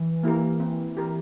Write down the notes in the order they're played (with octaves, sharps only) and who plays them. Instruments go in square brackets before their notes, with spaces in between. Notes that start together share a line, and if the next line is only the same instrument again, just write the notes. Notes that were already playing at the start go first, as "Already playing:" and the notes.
Already playing: [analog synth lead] E3
[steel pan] A#3 E4 G4 A#4
C4
G4 A#4